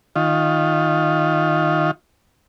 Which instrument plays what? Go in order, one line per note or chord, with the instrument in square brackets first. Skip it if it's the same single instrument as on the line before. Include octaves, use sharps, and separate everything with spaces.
[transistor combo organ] D#3 F4